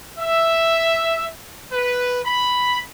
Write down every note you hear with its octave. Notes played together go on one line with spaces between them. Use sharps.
E5
B4
B5